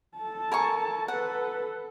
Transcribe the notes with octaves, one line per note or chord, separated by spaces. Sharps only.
A4 A5
A#4 G#5 C#6
A4 B4 F#5